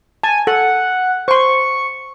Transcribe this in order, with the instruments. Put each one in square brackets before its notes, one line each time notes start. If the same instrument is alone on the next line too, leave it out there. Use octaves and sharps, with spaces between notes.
[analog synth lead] G#5 [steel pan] A5
[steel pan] A4 [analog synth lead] F#5
[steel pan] C5 C6 [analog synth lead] C#6